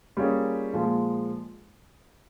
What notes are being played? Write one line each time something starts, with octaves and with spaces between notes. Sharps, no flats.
G3 A#3 C#4 F4 G#4
A#2 F3 G#3